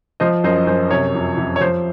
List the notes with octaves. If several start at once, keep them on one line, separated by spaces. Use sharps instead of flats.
F3 C5 D#5
F#2 C5 D#5
F#2 C5
C3 C#5
F2
F2
C#5
F3 C5